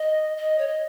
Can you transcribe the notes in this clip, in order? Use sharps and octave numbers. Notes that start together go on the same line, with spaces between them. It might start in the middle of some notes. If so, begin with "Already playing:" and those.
Already playing: D#5
D#5
C#5
D#5